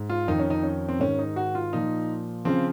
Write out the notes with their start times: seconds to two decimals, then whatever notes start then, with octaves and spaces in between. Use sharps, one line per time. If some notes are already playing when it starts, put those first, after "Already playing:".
Already playing: G#2
0.09 F4
0.28 F2 D#3 D#4
0.40 C#4
0.50 D#4
0.63 C#4
0.89 C4
1.00 G#2 D#3 C#4
1.19 D#4
1.36 F#4
1.55 F4
1.73 A#2 F3 D#4
2.45 C#3 F3 C4